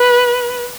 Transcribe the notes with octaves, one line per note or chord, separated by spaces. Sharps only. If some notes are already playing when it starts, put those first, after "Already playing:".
Already playing: B4